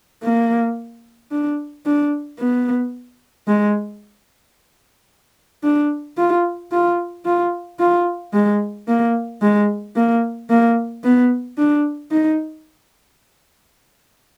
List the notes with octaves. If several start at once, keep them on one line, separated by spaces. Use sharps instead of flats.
A#3
D4
D4
B3
G#3
D4
F4
F4
F4
F4
G#3
A#3
G#3
A#3
A#3
B3
D4
D#4